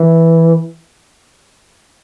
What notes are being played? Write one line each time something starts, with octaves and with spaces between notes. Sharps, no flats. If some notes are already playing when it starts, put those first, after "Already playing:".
Already playing: E3